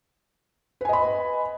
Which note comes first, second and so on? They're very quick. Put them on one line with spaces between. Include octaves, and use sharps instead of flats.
B4 G#5 D#5 B5